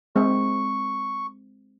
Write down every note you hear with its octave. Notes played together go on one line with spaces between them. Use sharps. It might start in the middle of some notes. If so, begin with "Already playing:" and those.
G#3 C4 C#6